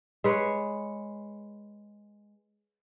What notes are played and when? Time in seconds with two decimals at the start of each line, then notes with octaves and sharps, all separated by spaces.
0.24 G#3 B4 C#5